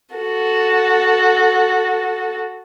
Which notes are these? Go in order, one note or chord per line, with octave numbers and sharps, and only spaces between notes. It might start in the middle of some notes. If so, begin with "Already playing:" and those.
F#4 A4